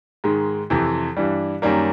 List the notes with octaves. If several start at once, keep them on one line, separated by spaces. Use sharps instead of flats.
G#2 D#3 G#3
F2 C3 E3
G2 E3 G3
F#2 D#3 G3 A#3